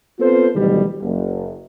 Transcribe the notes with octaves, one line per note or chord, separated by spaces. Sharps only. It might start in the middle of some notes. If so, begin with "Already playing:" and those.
B3 C4 F4 A4 B4 C5
D2 B2 D#3 E3 F#3 G3
F#1